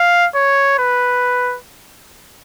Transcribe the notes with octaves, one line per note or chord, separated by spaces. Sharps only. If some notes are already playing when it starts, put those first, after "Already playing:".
Already playing: F5
C#5
B4